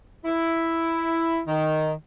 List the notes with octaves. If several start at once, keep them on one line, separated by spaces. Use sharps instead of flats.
E4
D#3